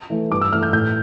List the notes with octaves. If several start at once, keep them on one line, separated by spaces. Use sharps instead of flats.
E3 A3
G2 D6
E6
E3 A3 F6
G6
A2 G6